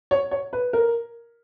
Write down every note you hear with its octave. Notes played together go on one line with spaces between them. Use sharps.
C#5
C#5
B4
A#4